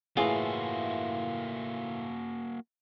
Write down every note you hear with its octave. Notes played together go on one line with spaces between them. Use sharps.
A2 E3 A#3 F4 F#4 G#4